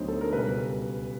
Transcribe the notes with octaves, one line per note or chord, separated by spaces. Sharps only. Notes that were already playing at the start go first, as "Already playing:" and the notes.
Already playing: D2 D3 F#3 B3 D#4 C5
A4
A#4
C#2 B2 G3 B4